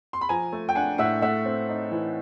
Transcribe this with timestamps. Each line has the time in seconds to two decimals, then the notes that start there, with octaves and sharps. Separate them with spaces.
0.13 C6
0.21 B5
0.29 F3 G#5 A#5
0.53 A3
0.69 G5
0.75 D4 F#5 G#5
0.98 A2 E5 F#5
1.22 A3 E5 F#5
1.45 C4
1.69 D#4
1.91 E3